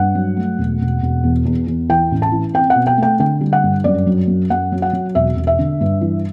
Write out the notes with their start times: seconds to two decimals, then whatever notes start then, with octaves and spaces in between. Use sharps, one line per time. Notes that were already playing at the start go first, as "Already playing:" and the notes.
Already playing: G2 F#5
0.15 F#3
0.37 A3
0.58 E1
0.81 E1
1.02 E1
1.23 E2
1.45 E2
1.67 E2
1.89 E3 G5
2.11 A1
2.22 A5
2.32 E3
2.54 C4 G5
2.70 F#5
2.76 B2
2.87 G5
2.97 A3
3.03 G5
3.19 D3 G5
3.41 G3
3.53 F#5
3.63 G2
3.84 F#2 D5
4.07 F#3
4.27 F#2
4.50 F#2 F#5
4.72 F#3
4.82 F#5
4.93 F#3
5.15 E1 E5
5.36 E1
5.47 E5
5.59 D3
5.81 G2
6.01 E3